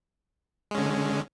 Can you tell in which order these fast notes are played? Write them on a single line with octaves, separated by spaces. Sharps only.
G#3 C#4 D3